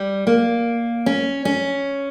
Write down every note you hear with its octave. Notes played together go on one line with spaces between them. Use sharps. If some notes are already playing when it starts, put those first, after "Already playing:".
Already playing: G3
A#3
C#4
C#4